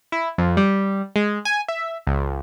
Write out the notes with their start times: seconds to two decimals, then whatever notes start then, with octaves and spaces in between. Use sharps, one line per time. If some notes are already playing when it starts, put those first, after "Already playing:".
0.12 E4
0.38 F2
0.57 G3
1.16 G#3
1.45 G#5
1.68 E5
2.07 C#2